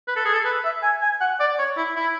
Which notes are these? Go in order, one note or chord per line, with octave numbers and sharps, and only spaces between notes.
B4
A4
G#4
A4
B4
E5
G#5
G#5
F#5
D5
C#5
E4
E4